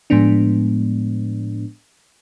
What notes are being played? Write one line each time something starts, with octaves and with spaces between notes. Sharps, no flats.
A2 F3 G#3 B3 D4